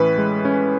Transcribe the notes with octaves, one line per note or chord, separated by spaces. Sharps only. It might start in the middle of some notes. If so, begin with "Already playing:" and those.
Already playing: A2 E3 C#4 B4
G#3
C#4